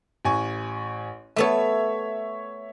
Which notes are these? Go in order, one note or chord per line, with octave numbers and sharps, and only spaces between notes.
A1 G#5 C#6
A3 B3 A4 C#5 E5